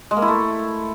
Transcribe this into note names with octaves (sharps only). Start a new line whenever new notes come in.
G#3
A#3
E4
A3